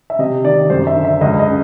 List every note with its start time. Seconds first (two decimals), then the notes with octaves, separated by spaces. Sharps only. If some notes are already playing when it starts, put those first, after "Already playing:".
0.10 E5
0.19 C3 D#5
0.44 D#3 D5
0.70 F#2 C5
0.87 E5
0.96 D3
1.05 E5
1.21 C#2 D#5
1.39 D#5
1.47 C#3